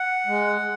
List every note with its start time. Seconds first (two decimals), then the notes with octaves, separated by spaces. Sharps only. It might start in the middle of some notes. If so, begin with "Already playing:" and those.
Already playing: F#5
0.27 G#3